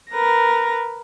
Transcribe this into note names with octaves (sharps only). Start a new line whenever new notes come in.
A#4 B4 A#6